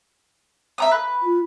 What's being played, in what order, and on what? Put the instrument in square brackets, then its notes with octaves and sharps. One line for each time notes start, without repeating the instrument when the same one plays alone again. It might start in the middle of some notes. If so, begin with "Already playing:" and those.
[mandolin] E5 A#5 D#6
B4
[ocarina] F4